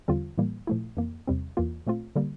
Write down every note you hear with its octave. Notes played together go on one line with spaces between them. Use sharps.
E2 D3 G3 C4 F4
A2 E3 G3 A#3
A#2 F3 A3 E4
F2 E3 A#3
E2 C3 G3 C4
E2 E3 A#3 F4
A#2 A3 C4 F4
D3 G3 A#3